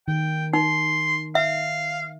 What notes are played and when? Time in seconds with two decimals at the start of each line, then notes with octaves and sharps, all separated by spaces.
0.08 D#3 G5
0.53 D#4 C6
1.35 E5 F5